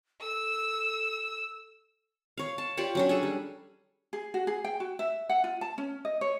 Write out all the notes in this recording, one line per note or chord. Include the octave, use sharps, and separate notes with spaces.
A4 E6
C#5 F5
A5
F4 G4 C#5 D5
F#3 C#4 D4
G#4 A4 G#5
G3
G#4
F#4
G#4
G5
F#4
E5
F#5
F4
A5
C#4
D#5
C#5